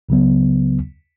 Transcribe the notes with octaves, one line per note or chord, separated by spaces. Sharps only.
C#2 C#3 F#3 B3